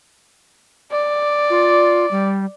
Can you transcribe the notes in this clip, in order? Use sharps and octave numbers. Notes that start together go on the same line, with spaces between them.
D5
F4
G3